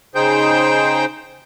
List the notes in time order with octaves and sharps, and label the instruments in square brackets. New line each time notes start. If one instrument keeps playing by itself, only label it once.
[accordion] C#3 D#4 G#4 C5 G5 G6